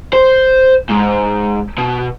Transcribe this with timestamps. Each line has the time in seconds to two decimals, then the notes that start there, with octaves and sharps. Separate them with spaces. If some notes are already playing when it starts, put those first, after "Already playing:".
0.13 C5
0.90 G#2
1.78 B2